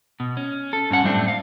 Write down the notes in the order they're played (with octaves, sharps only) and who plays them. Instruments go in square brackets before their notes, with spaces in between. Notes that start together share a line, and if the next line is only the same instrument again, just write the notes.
[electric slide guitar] B2
C#4
A4
G2 C#4 F#5 A5
F#2 A2 G3 A3 C4 D4
F5